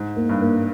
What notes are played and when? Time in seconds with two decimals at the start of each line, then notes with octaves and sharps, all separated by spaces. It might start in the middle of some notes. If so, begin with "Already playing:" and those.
Already playing: G#2
0.16 A#3
0.29 G2
0.41 A#3